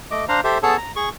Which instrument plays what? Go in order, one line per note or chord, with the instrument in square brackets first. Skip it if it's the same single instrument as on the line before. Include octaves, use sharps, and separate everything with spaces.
[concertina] A3 D#5 D6
D4 C5 F5 A#5
G4 A4 C5 E5
B3 G#4 A4 C#5 A5
A#5
G#4 C#6